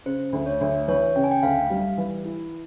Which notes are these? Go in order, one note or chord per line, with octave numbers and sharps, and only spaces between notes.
C#3 C5
D2
C#5
D2
E3 C#5
C#3 G5
G#5
G5
D2 F5
G3
E3
E4